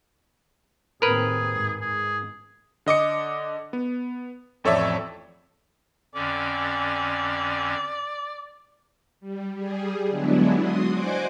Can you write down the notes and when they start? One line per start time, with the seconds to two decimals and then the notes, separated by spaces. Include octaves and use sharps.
1.02 D#2 A2 C4 G#4 A#4 B4
1.51 G#2
1.81 G#2 G#4
2.86 D3 D#5 D6 C#7
3.73 B3
4.64 A1 F2 A4 C#5 D5 E5
6.15 F2 D3 C#4 D5
9.21 G3
9.55 G3 G#4
10.09 D3 F#3 G#3 B3 D4 E4
10.57 F#4 C6 D#6
10.90 C5 D5 D#5 F#5 G#5 D6